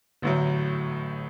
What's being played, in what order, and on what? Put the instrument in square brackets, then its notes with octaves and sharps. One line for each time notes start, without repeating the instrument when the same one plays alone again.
[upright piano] A1 A2 F#3 [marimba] D3